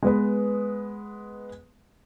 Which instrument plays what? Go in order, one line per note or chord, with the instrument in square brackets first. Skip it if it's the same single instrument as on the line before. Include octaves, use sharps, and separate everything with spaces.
[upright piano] G#3 B3 B4